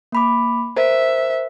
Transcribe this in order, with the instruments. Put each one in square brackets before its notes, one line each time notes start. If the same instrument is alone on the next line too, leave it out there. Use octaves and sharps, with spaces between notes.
[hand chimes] A#3 B5 D6
[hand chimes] A#4 C5 [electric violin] E5